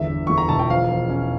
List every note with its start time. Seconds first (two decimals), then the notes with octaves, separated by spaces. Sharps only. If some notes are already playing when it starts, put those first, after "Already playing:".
Already playing: G1 E2 E5
0.10 D3
0.27 E2 C#6
0.38 A#5
0.49 E1 A5
0.59 G5
0.70 F3 F5
0.90 F3
1.10 C#4